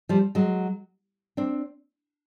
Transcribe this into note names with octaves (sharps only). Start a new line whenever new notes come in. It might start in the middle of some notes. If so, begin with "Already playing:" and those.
F3 G3
F#3 G#3
C4 D4